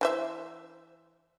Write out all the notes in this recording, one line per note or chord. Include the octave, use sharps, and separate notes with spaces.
E3 C5 E5